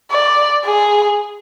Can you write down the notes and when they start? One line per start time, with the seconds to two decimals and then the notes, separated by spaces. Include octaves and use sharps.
0.11 D5
0.65 G#4